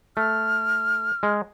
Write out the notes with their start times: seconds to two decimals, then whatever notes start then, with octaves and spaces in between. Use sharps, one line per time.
0.17 A3 F6
1.23 G#3